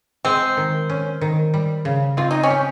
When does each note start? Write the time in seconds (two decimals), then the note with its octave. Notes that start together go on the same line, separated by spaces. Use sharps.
0.25 G#3 C4
0.57 D#3
0.90 C#4
1.21 D#3
1.54 G3
1.85 C#3
2.17 C4 F4
2.31 D#4
2.43 C#4
2.50 G4